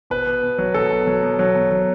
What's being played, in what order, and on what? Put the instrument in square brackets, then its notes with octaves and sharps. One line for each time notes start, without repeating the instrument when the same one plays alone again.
[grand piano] B2 B4
B2
B2
F#3
B2 A4
B2
F#3
B2
F#3
B2
F#3